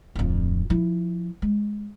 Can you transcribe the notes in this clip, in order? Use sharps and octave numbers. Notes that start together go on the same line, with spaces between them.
D1 F2
F3 E4
G#3